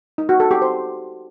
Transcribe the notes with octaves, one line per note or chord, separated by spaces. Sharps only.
D#4
F#4
A4
G4
C5